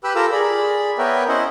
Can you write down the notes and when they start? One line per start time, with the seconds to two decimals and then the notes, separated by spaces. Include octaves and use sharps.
0.04 G4 B4 G5 B5 E6 F#6
0.15 F4 A4 A#4 A#5 D6 E6
0.32 G#4 D5 B5
0.98 B3 A#4 B4 C#5 E5 G5
1.28 C#4 E4 C5 D#5 F#5